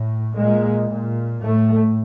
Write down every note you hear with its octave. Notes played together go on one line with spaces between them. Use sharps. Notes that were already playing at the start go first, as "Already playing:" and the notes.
Already playing: A2
A#2 G#3
A#2
A2 A3